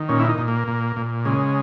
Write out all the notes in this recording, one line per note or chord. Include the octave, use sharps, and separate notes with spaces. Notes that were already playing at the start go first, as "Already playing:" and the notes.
Already playing: D#3
A#2 C#4
E4
D#4
A#2
A#3
A#2
A#2
C#3 G#3